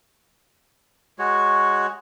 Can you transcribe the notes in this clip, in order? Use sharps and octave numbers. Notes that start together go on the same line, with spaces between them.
G#3 F#4 C#5